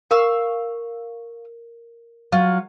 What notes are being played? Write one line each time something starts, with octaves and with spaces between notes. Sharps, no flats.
A#4 F5 C#6 E6
F#3 F4